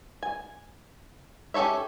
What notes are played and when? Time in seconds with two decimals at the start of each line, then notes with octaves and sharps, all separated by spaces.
0.23 G#5
1.54 C#4 G4 A4 C#5 E5